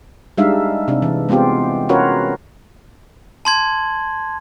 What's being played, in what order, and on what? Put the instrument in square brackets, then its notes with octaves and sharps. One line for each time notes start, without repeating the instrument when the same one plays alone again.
[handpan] G3 G#3 D4 D#4 E5 F5
C3 D4
E3
G#3 B3 C4 F4 G4
C#4 F4 F#4 A#4 B4 C#5
[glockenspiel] A5 C6 G#6